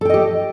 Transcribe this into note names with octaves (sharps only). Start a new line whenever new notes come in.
G4 A4 D#5 G5